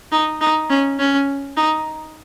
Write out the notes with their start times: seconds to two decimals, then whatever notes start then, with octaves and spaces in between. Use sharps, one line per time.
0.12 D#4
0.41 D#4
0.70 C#4
0.99 C#4
1.57 D#4